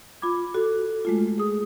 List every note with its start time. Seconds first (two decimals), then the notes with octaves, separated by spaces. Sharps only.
0.22 F4 B5 D6 G#6
0.54 F#4 A4
1.05 G#3 A3 F4
1.38 G#4 D#6